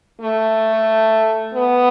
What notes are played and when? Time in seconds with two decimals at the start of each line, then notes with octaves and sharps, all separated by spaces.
0.21 A3
1.55 B3